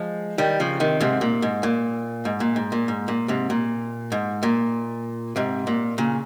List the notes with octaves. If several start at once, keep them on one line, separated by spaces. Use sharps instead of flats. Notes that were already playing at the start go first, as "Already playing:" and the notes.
Already playing: F3 G#3
D#3 G3
C#3 F3
C3 D#3
G#2 C3
A#2
G#2
A#2
G#2
A#2
G#2
A#2
G#2
A#2
G#2 C3
A#2
G#2
A#2
G#2 C3
A#2
A#2 C#3